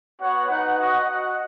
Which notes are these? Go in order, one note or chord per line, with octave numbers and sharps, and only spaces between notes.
B3 F#4 C#5 F#5
D#4 B4 F#5
F#4 D#5 F#5
F#4 D#5 F#5